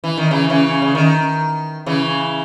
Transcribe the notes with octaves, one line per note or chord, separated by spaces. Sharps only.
E3
D#3
C#3 E3
C#3 E3
C#3
D#3
C#3 E3